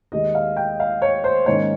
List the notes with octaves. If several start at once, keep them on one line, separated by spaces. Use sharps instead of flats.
D#2 D#3 G#3 D#4 D#5
F5
G5
F5
C#5
C5
G#2 D#3 A#3 C#4 C#5